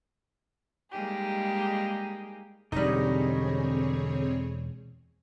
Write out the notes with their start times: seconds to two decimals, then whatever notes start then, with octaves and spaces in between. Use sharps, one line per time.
0.92 G3 G#3 A#3 D#4 G4 G#4
2.72 E1 D3 G3 C4 D#4 G#4 C#5 D#5